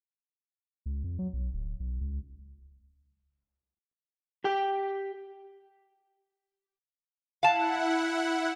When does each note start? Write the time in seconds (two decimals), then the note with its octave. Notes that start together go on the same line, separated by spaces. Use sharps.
0.86 C#2
1.04 F2
1.19 F#3
1.33 B1
1.53 D1
1.80 B1
2.01 C#2
4.44 G4 G5
7.43 E4 F5 F#5 A5